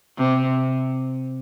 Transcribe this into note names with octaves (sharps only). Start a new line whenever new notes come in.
C3